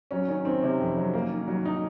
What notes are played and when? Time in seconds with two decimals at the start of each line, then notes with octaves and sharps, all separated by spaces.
0.11 F#3 C#4
0.28 D#3 C#4
0.45 D#3 C4
0.62 C3 C#4
0.80 F2
0.97 F#3
1.14 A#3
1.31 D#3
1.48 F#3
1.65 D#4